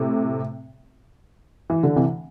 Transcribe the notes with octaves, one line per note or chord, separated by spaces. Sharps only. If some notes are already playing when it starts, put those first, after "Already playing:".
Already playing: A2 C3
E3
D3
C3 E3